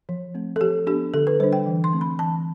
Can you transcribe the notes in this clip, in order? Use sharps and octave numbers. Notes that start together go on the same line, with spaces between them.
F3
A3 C4
A4
F3 G4
B3 D4 G4
D3 A4
B4
G3 D4 C5
G5
E3
C6
A3 C4
B5
E3 A5